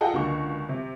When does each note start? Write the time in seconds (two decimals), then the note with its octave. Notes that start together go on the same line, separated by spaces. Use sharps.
0.01 F4 G#4 A4 D#5 F#5 G5
0.13 C#2 D3 A#3 F#4 C#6
0.69 C3